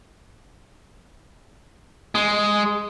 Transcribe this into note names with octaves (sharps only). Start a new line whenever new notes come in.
G#3